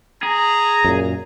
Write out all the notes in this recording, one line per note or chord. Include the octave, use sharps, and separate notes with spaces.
G#4 A#5
F#2 A#2